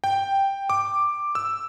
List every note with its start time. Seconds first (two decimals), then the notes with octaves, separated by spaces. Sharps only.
0.04 G5
0.70 D6
1.35 E6